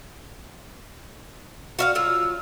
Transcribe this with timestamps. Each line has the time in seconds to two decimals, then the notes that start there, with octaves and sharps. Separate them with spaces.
1.79 F#4 E5 F5
1.95 F#3 F4 E6